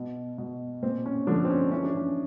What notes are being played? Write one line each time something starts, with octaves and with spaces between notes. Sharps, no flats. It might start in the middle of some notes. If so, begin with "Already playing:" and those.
Already playing: B2
B2
A#2 C4
C#4
D3 F3 D4
C4
C#4
E3 C#4
D4
C#4